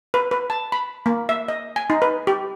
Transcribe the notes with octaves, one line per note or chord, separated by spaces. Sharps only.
B4
B4
A5
B5
A#3
E5
D#5
G#5
D#4
B4
G4